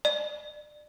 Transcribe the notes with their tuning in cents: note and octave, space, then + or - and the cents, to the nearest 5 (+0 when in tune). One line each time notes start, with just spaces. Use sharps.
D5 +30